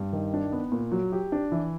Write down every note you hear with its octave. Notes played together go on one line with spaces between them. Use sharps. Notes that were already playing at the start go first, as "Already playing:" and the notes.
Already playing: G2
D#3
D4
B3
A#2
F#3
G4
D4
E3